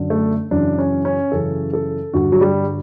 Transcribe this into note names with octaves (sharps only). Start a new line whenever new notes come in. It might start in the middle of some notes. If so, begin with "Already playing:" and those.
Already playing: F#2 D3
A3
F#2 C#3 E3 D4
C#4
C#4
F#2 C#3 E3 A4
A4
G2 D3 F#4
F#3
G3